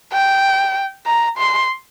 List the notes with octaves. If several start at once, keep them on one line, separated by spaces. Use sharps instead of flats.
G5
A#5
C6